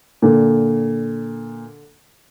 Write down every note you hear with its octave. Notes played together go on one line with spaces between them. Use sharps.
A#2 D3